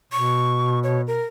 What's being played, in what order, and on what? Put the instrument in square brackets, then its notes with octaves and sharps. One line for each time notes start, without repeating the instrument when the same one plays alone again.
[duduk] B2 [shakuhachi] C#6
[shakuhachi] C#5
A#4